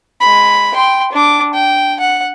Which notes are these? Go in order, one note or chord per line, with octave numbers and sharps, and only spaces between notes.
G#3 B5
G5 C6
D4 D6
G5
F#5